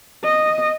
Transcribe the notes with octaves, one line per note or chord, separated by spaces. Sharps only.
D#5